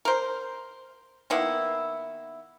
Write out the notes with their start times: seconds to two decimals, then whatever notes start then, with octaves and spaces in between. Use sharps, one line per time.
0.05 A#4 C5
1.30 D#3 A#3 B3 E4